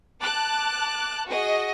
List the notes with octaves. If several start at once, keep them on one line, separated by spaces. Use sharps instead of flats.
A5 D6 F#6
F#4 G#4 D#5